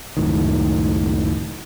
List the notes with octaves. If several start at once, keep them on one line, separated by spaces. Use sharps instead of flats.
C#2 F#2 A2 D#3